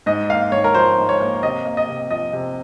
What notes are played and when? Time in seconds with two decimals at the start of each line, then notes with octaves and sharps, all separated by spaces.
0.06 G#2 D#5
0.29 A#3 F5
0.52 G#2 C#5
0.64 A#4
0.74 F3 C5
0.98 G#2
1.09 C#5
1.20 A#3
1.43 C3 D#5
1.65 A#3
1.77 D#5
1.88 C3
2.10 F3 D#5
2.33 C3